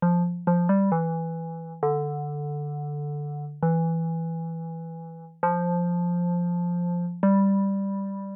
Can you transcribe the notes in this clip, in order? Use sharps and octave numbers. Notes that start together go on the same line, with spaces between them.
F3
F3
G3
E3
D3
E3
F3
G3